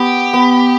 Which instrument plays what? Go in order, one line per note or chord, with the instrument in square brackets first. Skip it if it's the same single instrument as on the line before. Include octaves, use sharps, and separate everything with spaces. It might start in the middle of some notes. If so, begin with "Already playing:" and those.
Already playing: [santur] B3 [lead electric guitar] G4
[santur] B3